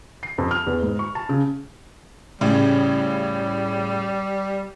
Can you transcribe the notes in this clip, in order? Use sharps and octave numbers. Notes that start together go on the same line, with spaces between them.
C7
F2
F6
E2
G#2
C#6
A5
C#3
A2 C#3 G3